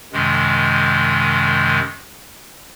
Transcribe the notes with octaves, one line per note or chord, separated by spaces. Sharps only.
F#2 C3 D#3 G#3